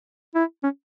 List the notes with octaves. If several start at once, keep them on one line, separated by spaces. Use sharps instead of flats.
E4
C#4